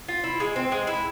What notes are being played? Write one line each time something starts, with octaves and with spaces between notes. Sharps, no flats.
F4
E4
G#3
C4
G#3
E4